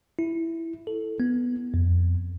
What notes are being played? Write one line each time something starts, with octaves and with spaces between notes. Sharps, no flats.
E4
A4
B3
F2